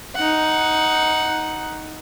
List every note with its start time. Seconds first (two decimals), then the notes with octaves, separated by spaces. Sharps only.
0.16 D#4 F#5